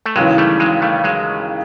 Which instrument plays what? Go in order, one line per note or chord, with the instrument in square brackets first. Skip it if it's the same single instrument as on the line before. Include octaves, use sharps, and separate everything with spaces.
[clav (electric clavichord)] A3
[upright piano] D#2 C#3 E3 [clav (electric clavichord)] F#3 G#3
[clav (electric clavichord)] G3 A3
F#3 G#3
G3 A3
F#3 G#3